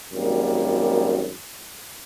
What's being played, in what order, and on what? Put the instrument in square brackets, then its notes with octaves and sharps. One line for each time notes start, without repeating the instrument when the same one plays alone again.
[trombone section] G#1 F#2 G3 A#3